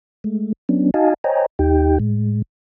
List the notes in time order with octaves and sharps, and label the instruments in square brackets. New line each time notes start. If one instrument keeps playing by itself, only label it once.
[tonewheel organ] G#3 A3
F#3 B3 C#4 D4
D#4 F#4 D#5 F5 G#5 A5
C5 C#5 D#5 G5 G#5 A#5
D#2 D#4 G4 G5
A2 G#3